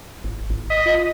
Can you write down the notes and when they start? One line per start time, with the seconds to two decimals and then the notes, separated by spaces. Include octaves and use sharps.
0.24 G#1
0.50 G#1
0.70 D#5 B6
0.86 F4